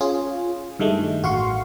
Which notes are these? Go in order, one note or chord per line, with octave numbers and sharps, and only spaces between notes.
C#4 F4 G#4
G2 D#3 G#3 A3
A1 F#4 F5 C6 C#6